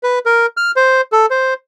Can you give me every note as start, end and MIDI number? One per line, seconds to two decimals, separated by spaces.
0.03 0.19 71
0.26 0.46 70
0.57 0.71 89
0.76 1.01 72
1.12 1.26 69
1.31 1.54 72